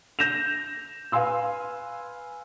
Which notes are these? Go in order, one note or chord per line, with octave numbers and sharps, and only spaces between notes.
G6 A#6 E7 F7
B4 F5 G#5 C6 E6